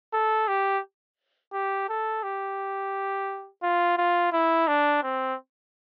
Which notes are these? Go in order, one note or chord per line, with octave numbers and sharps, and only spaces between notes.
A4
G4
G4
A4
G4
F4
F4
E4
D4
C4